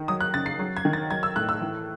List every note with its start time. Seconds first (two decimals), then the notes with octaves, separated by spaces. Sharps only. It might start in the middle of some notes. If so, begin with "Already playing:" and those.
Already playing: D#3
0.08 F#3 D#6
0.21 F#6
0.34 C#3 A6
0.46 C7
0.59 F#3
0.77 G#6
0.85 D#3
0.93 A6
1.10 F#3 G#6
1.23 E6
1.36 A2 F#6
1.49 E6
1.61 E3